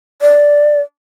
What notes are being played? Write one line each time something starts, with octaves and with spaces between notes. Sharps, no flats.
D5